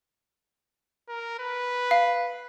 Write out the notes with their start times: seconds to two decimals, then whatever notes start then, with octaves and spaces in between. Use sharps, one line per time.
1.09 A#4
1.39 B4
1.91 F5